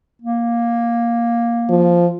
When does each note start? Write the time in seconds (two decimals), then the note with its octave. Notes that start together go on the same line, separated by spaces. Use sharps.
0.22 A#3
1.69 F3